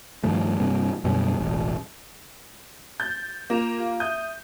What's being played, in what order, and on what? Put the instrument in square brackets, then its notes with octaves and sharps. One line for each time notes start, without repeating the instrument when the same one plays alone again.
[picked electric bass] G2 D#3 F3 A3
G2 C3 A#3
F#2 B2 D3 G3
E1 A1
[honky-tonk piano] G6 [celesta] A6
[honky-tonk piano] A#3 [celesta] F4 E7 F7
[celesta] F4 G4 F5
[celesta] E5 D#6 D#7 [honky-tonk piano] G6